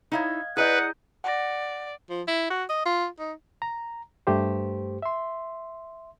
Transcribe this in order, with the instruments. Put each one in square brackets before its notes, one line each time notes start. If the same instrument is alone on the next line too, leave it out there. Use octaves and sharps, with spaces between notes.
[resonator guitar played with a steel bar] D#4 E4 C#5 [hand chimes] D#5 F5 G#6
[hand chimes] E4 A#5 G6 [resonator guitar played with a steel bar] G#4 D5 D#5 [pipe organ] B4 [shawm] F#5
[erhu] D5 [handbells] F#5 A#6
[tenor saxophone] F3
E4
F#4
D#5
F4
D#4
[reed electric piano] A#5
G2 A3 G4 C5
E5 C6